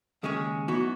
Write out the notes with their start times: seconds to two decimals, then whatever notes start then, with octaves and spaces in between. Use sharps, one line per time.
0.23 D#2 C#3 G#3 C#4 G#4
0.68 F#2 E3 B3 D#4 F#4